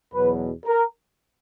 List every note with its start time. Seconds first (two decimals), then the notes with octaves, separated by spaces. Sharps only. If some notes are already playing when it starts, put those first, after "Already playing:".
0.13 E2 B2 F#3 B4
0.66 A#4